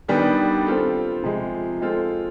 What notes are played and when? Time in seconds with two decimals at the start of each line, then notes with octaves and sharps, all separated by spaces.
0.08 D#3 G3 B3 D4
0.66 C4 F4 A4
1.23 C3 F3 G#3
1.81 G#3 C4 F4 A4